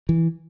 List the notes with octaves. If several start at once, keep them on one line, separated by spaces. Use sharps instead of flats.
E3